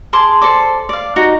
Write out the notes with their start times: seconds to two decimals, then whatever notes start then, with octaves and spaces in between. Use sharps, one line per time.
0.13 G#4 A5 C6 D6
0.42 A4 C5 D5 D6
0.89 D5 F5
1.16 D#4 F#4